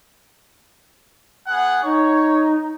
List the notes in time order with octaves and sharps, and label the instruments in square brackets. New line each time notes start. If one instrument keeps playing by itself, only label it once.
[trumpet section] B3 G#4 F#5
[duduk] D#4 [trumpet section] C#5